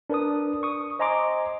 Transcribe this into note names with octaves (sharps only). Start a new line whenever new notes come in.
D4 A#4 B4 A5 D#6
C#6 D#6
C5 D#5 G#5 A#5 C6 D6